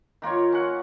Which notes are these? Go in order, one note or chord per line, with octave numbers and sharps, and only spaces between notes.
D#3 A#3 F4 C#5
C#4 F#5